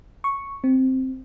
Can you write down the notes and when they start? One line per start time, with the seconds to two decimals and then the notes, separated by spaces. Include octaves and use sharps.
0.24 C#6
0.64 C4